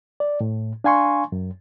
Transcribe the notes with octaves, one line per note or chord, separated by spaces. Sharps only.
D5
A2
D4 F5 G#5 C6 C#6
F#2